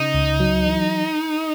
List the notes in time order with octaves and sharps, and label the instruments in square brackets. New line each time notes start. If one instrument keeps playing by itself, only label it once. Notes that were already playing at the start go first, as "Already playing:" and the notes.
Already playing: [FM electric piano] C#3 [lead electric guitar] D#4
[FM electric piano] C#2
F#3
E3